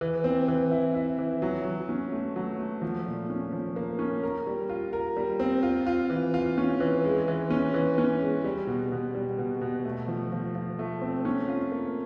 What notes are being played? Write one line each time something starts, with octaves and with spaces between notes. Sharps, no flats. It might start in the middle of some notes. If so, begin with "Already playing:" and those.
E3
C4
E3
E4
E4
E3
F#3
F#3
C#4
A3
F#3
A3
F3
A#2
C#4
F3
A#3
C#4
A#4
G3
F4
A#4
G3
C4
F4
F4
E3
F4
C#4
E3
G#3
E3
C#4
E3
C#4
G#3
G3
B2
B2
G3
B2
B2
A3
F3
F3
F3
A3
C4
C#4
F4
A#3